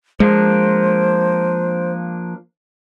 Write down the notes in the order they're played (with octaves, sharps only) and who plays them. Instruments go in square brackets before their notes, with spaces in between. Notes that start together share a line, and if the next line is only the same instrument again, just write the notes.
[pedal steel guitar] F3 A#3 D4 [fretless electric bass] G#3 [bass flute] C5